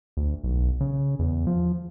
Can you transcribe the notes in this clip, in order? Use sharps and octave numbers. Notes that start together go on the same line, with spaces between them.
D2
B1
C#3
E2
F3